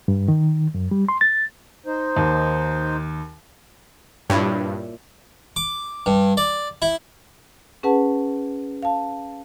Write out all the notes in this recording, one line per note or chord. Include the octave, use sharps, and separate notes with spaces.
G2
D#3
F#2
G3
C6
A6
D#4 C5
D#2
G2 A#2 E4 C#5
D6
G2
D5
E4
C#4 G#4 B4 F#5 A5
F5 A5